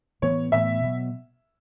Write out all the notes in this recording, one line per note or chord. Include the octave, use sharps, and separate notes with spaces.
A2 E3 B3 C#5
A2 E3 B3 E5
B2 F#3